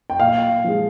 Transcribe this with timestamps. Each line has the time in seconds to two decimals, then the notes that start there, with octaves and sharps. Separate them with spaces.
0.10 G5
0.20 A#2 F5
0.64 F3 G#3